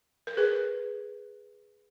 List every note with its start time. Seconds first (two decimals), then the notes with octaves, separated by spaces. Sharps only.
0.27 A#4
0.37 G#4 B4